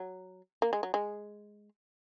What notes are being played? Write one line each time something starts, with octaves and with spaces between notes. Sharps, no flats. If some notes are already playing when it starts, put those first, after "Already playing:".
Already playing: F#3
A#3
G#3
F#3
G#3